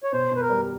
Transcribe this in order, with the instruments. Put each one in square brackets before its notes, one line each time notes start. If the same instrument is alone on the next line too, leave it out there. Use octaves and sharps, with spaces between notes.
[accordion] C#5
[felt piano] B2 [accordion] C5
[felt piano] B2 [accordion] B4
[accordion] A#4
[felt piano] G3